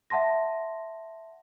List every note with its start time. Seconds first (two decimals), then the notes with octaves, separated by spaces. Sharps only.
0.10 E5 F#5 A5 C6 A#6